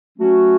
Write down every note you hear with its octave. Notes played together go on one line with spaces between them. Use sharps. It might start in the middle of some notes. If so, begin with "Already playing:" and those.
F#3 A3 C#4 F#4